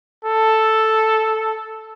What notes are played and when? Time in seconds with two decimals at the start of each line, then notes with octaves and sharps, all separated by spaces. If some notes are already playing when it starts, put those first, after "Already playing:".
0.25 A4